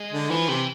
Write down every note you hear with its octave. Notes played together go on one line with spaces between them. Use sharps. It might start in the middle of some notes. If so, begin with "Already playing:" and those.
Already playing: G#3
D3
E3 F3
C3 E3